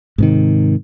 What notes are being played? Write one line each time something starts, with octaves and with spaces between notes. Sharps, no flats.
G#2 C3 D#3